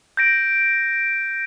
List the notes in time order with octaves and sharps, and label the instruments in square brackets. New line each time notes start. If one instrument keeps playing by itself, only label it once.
[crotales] G6 A#6 D7